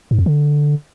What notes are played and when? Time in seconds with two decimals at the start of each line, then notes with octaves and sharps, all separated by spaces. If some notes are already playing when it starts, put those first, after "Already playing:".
0.11 G#2
0.19 F2
0.26 D3